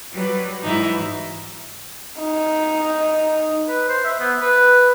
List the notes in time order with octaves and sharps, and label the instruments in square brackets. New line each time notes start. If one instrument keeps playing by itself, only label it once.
[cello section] F#3 G3 B4
[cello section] G#2 E3 F#3 [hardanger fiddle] D#4 E4
[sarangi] D#4
[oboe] B4
C5
E5
B3
B4